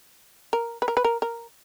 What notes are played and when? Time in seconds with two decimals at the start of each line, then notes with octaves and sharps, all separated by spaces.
0.53 A#4
0.82 B4
0.88 A#4
0.97 B4
1.04 A#4
1.22 A#4